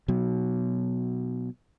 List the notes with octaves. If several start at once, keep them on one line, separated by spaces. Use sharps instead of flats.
B2 F#3